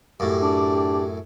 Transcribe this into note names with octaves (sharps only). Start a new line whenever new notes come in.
F#2 A2 G4
D4